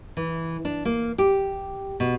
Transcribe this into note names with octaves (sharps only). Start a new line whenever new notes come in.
E3
D4
A#3
G4
B2